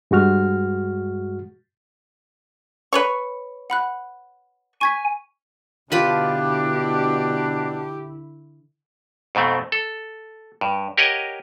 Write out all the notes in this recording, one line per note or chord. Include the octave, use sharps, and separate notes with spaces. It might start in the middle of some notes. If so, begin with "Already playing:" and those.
G2 G#3 F#4 F6
B4 C#5 C#6
F#5 B5 F#6
G#5 C#6 G#6 B6
B2 D3 D4 E4 F4 G4 B4 B5
F2 G#2 B2 A3 C4
A4
G2
G4 A#4 C#5 D#5 F#5 G#5